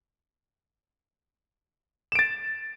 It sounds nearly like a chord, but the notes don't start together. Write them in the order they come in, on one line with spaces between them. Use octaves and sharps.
E7 D7 A6